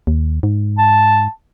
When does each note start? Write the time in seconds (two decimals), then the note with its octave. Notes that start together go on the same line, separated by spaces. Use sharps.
0.07 D#2
0.43 G#2
0.78 A5